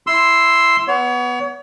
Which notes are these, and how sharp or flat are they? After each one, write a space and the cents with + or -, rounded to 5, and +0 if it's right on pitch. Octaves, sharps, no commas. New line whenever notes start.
E4 +0 C6 +0 E6 +0
B3 +0 C#5 +35